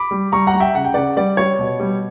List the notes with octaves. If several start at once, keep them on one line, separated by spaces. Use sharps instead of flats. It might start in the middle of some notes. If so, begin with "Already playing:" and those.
Already playing: B5 D6
G3
G3 A#5 C#6
F#5 A#5
G3
E5 G5
C#3 F#5
G5
C#3 D5 F#5
G3 D5
G3 C#5
B2
G3